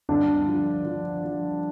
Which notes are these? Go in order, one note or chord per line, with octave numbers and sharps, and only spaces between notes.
G2 D3 D4
F3
F3
F3